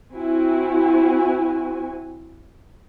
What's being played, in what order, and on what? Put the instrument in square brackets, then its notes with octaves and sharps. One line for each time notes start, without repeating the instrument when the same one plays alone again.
[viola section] C4 E4 F#4 G#5